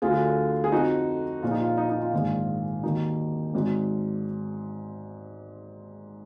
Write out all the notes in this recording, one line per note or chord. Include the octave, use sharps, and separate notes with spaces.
D2 D3 F#3 F4 G#4
G#4
F2 F3 D#4 F#4
A#1 A#2 F3 F4
D#4
F4
D#4
D#4
F4
A#1 G#2 D#3 F4
D#2 D#3 F#3 D#4
G#1 G#2 F#3